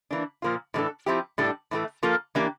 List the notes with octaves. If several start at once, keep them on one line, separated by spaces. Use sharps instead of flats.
E3 A#3 D4
A#2 F3 A#3 F4
A2 E3 G3 D4 A4
F3 C4 E4 G4
A2 G3 D4 A4
A2 E3 A3
F3 A#3 F4 A4
E3 A#3 D4 G4